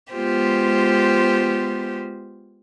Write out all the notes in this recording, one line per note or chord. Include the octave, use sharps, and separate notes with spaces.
G#3 B3 F4 G4 C5